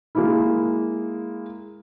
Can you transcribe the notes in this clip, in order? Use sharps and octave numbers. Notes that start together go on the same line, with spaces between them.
G#3 A#3 E4